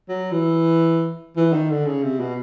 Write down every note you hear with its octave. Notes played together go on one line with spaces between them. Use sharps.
F#3
E3
E3
D#3
D3
C#3
C3
B2